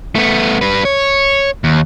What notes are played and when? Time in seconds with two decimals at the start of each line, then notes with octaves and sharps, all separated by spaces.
0.15 A3 B3
0.61 G3 B4
0.85 C#5
1.64 D#2